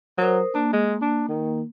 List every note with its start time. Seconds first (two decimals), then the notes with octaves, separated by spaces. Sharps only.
0.18 F#3 A#4 C5 D#6
0.55 A#3 D4
0.73 G#3
1.02 D4
1.28 D#3